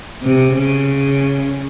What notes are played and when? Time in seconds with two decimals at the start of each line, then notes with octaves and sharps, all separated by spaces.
0.23 C3
0.54 C#3